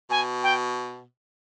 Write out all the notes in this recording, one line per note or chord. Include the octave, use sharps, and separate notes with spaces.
B2 G#5
G5